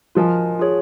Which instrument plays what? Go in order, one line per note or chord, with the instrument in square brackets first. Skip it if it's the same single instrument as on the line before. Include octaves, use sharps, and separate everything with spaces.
[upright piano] F3 [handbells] F4 A#4 D#5 G#5
[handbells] F4 G#4 C#5